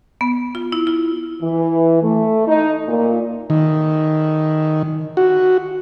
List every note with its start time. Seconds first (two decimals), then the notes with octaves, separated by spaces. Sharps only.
0.21 B3
0.55 F4
0.72 E4
0.87 F4
1.43 E3
2.03 A3
2.48 D#4
2.88 A#2
3.50 D#3
5.17 F#4